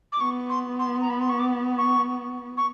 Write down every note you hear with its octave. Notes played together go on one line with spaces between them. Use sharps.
D6
B3 C#6
C6
C6
A#5
B5
C6
C#6
D6
C#6
C#6